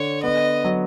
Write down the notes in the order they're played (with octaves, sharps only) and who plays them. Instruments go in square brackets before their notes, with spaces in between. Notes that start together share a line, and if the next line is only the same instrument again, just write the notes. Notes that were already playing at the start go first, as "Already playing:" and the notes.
Already playing: [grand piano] D3 [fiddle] C#5
[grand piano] B3 [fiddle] D#5
[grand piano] F#3